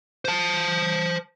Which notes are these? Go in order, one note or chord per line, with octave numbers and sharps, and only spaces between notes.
C5 A5